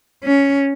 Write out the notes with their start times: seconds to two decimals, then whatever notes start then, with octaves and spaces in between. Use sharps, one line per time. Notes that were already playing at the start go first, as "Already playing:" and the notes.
0.24 C#4